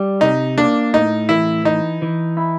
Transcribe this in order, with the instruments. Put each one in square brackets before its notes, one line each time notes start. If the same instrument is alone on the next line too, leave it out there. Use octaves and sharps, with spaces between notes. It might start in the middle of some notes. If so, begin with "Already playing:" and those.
Already playing: [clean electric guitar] G3
[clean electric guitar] C3 [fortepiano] D#4
[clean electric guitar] A#3 [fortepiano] D4
[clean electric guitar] A2 [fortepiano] D#4
[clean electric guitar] E3 [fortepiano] E4
[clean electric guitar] E3 [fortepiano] D#4
[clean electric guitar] E3
E4